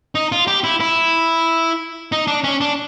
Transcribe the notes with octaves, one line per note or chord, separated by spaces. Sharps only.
D#4
F4
G4
E4
E4
D#4
D4
C#4
D4